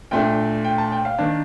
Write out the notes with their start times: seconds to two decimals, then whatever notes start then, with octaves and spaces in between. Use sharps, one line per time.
0.11 A#2 A3 D4 G5
0.64 G5
0.78 A5
0.92 G5
1.05 F5
1.19 D#3 A#3 D4